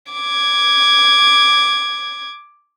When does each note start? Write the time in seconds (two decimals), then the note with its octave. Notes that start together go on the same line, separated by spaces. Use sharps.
0.13 D6 G#6